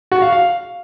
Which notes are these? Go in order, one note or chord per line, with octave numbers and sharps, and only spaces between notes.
F#4
F5
F5